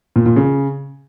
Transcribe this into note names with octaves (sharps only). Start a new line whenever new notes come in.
A#2
A#2
C#3